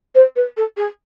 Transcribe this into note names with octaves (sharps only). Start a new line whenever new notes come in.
C5
B4
A4
G#4